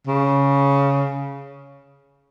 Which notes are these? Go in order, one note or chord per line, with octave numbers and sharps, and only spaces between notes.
C#3